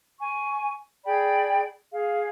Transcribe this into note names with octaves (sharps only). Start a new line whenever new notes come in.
G#5 C#6
G#4 D5 G5 B5
G#4 F5